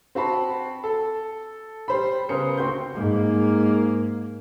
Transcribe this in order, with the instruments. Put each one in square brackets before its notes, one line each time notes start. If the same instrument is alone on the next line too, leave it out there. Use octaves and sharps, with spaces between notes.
[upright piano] C4 F#4 A5 B5
A4
G3 C5 B5
C#3 B3 A#4 C5 C#7
D2 C4 F#4 C6 G6
[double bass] G#2 A#3